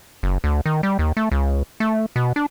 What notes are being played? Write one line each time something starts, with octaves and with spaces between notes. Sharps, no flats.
F#1
D2
D#3
G3
D#2
A3
C#2
A3
B2
D4